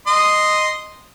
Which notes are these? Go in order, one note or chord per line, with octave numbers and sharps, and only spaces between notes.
D#5 C6 D#6